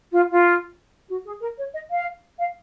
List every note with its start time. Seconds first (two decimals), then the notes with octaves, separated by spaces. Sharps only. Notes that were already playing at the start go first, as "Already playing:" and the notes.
0.11 F4
0.30 F4
1.08 F#4
1.25 G#4
1.41 A#4
1.57 C#5
1.74 D#5
1.90 F5
2.39 F5